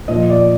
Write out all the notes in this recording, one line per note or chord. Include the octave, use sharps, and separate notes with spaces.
A#2 F3 D#5
D5